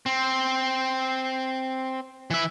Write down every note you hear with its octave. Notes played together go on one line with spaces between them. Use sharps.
C4
E3 E5